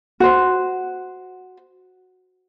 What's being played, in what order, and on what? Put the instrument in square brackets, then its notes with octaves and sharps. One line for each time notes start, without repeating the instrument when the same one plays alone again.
[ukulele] F#4 C5